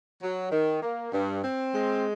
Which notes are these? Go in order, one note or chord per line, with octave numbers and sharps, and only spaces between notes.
F#3
D#3
A#3
G2
C4
G#3